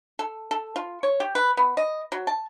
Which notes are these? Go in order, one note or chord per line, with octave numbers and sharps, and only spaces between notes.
A4
A4
F4
C#5
G4
B4
B3
D#5
F#3
A5